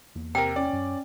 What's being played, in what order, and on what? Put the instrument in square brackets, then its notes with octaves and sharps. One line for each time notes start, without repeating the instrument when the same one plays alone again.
[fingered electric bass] E2 A#3
[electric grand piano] C3 A#4 [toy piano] G5
[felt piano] C#4 [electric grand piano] D5
[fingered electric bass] F#2